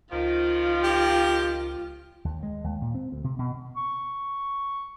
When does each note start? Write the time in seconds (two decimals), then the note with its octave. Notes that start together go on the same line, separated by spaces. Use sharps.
0.12 C#2 D#3 F3 F4
0.84 G4
2.25 D#2
2.43 G#3
2.64 D#2
2.82 A#2
2.95 C4
3.12 D2
3.24 C3
3.39 B2
3.76 C#6